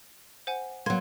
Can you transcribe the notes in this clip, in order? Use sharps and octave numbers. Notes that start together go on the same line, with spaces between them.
C5 F#5 G#5
F#3 A#3 C6 G#6